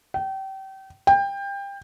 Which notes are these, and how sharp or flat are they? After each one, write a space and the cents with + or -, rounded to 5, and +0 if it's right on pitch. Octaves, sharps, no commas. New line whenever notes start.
G5 -30
G5 +25